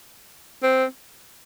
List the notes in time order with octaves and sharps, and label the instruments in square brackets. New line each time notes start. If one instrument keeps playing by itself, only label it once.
[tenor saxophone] C4